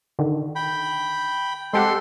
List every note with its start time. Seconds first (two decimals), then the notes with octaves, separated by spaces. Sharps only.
0.19 D3 D#3
0.56 G5 B5
1.73 G#3 C4 G4 A4 F#5 C6